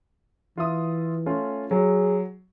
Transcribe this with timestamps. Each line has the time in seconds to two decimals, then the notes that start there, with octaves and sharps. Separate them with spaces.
0.57 E3 F4 E5 D#6
1.26 A3 C#4 F4
1.71 F#3 G#4